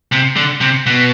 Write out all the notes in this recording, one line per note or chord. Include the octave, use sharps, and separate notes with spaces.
C3
D3
C3
B2